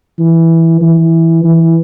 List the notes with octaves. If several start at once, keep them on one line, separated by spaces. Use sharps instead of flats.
E3
E3
E3